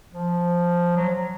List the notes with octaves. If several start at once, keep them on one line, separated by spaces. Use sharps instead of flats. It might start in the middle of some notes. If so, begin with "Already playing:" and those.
F3
F#3
F#3